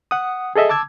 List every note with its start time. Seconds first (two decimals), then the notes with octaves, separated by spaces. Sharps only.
0.11 F#5 D#6
0.56 G#4 A4 D#5 E5
0.69 A5 D6 E6 G#6